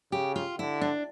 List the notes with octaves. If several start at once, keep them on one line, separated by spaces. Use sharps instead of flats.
C#3 G4
F4
D3 E4
D4